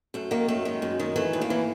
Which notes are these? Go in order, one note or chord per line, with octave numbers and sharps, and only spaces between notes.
F#2 A3
D#3 A#3
F#2 A3
D#3 G#3
F#2
D#3
E3 A3
A2
A#3
E3